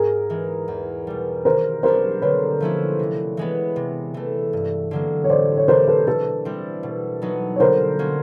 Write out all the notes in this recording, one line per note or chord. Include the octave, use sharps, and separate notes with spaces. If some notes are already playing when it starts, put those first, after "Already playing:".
Already playing: G#2 G#4 A#4
E3 G#3
E2
B2 G3
D#3 A#4 C5
F#3 B3 D4 A#4 C5
D3 B4 C#5
F3 A3 C#4 E4
C3
E3 G#3 B3
C3
E3 A3
G2
D3 F#3 A#3
C#5
A2 C5 D5
C#5
E3 A3 D4 A#4 C5
A4 B4
B2 A4 B4
G3 C4 E4
B2
F#3 B3 D#4
C#5
D3 A#4 C5
F#3 A#3 C#4